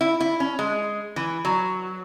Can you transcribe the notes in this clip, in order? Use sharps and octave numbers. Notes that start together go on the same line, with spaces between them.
E4
E4
C#4
G#3
E3
F#3